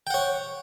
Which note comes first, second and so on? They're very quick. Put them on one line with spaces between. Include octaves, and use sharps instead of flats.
G5 F#5 C#5